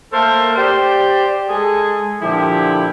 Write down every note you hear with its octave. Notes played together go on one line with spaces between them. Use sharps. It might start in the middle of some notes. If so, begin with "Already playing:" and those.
A3 A#3 A4 A#4 C5
G4 C5 D5
G#3 G#4 A4
A#2 D3 F3 E4 G4